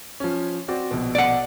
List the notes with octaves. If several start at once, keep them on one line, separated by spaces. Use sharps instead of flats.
F3 C#4
C4 F#4 D5
A#1 B2
D5 F#5